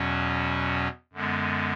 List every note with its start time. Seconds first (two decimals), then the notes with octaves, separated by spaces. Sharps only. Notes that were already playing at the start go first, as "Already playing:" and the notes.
Already playing: E2 B2 F#3 C#4
1.13 F#2 D3 G#3 B3